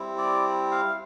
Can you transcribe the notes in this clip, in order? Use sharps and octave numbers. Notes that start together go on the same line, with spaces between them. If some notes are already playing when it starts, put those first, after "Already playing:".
Already playing: G3 C4 E4
D5
F5